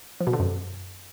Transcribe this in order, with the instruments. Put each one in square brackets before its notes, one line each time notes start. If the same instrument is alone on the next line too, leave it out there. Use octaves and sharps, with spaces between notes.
[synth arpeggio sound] F3
B2
D3
F#2